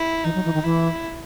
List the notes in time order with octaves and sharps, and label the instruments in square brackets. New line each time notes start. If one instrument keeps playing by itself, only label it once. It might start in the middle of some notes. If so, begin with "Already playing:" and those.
Already playing: [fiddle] E4
[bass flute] E3 [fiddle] D#4
[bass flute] F#3
E3
D#3
[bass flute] E3 [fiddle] E4